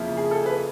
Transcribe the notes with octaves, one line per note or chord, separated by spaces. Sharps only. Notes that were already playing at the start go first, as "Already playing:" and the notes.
Already playing: F2 C#3 F3 A#3 E4
G#4
A4
B4